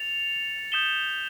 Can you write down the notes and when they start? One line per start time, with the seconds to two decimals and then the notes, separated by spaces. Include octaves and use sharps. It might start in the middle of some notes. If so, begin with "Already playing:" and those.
Already playing: A6 C#7 F7
0.72 D#6 G6 B6 E7 G7